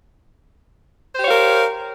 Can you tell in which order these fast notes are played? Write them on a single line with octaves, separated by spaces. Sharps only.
C5 G4 C#5 F5 A#4